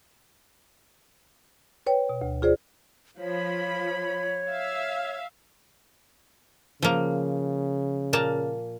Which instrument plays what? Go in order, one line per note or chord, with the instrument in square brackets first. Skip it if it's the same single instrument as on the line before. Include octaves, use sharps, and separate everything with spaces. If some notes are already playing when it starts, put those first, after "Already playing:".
[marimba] B4 C#5 G5
B2
D2
F4 G#4 C5 D5
[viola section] F3 B5 [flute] C#5
[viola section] E5 F5
[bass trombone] C#3 [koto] F3 A#3
[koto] A#2 A#3 A5